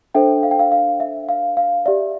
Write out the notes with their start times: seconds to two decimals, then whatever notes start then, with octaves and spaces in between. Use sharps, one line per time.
0.15 D4 A4 C5 E5 G5
0.43 F5
0.51 G5
0.59 F5
0.72 F5
1.00 E5
1.29 F5
1.57 F5
1.86 G4 D5 E5